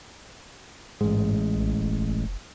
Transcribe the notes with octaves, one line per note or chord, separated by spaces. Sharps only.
A1 G#2 G#3
A#1
F1